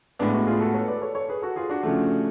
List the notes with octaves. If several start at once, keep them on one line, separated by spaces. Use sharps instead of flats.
A2 G#3 B3 D4
D4 F#4
F4 G#4
F#4 A4
A4 C#5
B4 D5
A4 C#5
A4 C#5
G#4 B4
F#4 A4
F4 G#4
D4 F#4
C#3 F3 A3